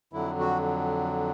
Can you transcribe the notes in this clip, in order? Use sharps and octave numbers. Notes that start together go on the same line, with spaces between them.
F2 D3 F#3 E4
F#4